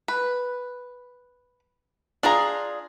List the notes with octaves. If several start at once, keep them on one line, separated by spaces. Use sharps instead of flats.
B4
D4 F4 G#4 A#5